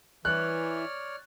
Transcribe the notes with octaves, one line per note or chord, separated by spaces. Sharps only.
E3 C#5 D5 F6 F#6